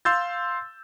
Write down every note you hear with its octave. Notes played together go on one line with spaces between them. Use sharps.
F5 C6 E6 G6 A6